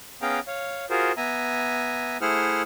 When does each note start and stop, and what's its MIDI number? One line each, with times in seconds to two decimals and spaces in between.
0.22 0.40 59
0.22 0.40 61
0.22 0.40 68
0.22 0.40 77
0.22 0.40 79
0.22 0.40 82
0.47 0.85 73
0.47 0.85 77
0.90 1.12 65
0.90 1.12 66
0.90 1.12 68
0.90 1.12 70
0.90 1.12 72
1.17 2.17 59
1.17 2.17 76
1.17 2.17 80
1.17 2.17 82
2.21 2.62 57
2.21 2.62 64
2.21 2.62 68
2.21 2.62 72
2.21 2.62 78
2.21 2.62 89